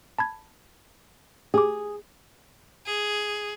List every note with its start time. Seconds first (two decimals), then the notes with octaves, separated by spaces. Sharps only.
0.19 A5 B5 G#6
1.54 G4 G#4 D6
2.86 G#4